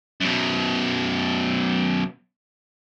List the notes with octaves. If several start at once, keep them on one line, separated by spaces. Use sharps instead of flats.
F#2 B2